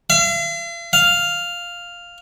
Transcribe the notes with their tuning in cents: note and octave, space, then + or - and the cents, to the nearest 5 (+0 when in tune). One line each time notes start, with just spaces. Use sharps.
F5 -45
F5 +0